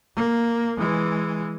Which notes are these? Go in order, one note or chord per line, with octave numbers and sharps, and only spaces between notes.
A#3
E3 G#3